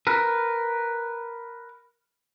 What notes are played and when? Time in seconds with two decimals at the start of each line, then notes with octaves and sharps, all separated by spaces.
0.07 A#4 B4